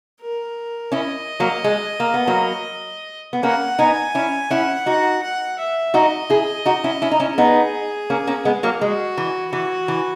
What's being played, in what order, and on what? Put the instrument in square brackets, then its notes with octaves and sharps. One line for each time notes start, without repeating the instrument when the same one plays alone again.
[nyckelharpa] A#4
[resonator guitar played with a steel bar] C#4 E4 [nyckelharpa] D#5
[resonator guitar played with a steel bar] F#3 A#3
G#3
A#3
B3
F#3 A#3
B3
[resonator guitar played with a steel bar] A#3 C#4 [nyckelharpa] F#5
[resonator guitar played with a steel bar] B3 D#4 [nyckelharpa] G#5
[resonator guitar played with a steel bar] C#4 E4
[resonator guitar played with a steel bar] C#4 E4 [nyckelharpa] F#5
[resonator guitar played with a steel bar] D#4 F#4
[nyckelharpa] F#5
E5
[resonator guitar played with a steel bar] D#4 F#4 [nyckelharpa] D#5
[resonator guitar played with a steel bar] E4 G#4
D#4 F#4
C#4 E4
C#4 E4
D#4
C#4 E4
[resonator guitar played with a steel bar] B3 D#4 [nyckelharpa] G#4
[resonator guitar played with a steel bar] A#3 C#4
A#3 C#4
G#3 B3
F#3 A#3
[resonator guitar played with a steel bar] G#3 [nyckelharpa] F#4
[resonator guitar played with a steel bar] E3
[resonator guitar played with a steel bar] E3 [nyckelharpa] F#4
[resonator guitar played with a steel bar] E3